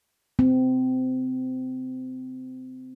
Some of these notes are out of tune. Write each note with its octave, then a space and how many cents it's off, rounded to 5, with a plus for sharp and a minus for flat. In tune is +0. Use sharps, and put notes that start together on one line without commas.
C4 -25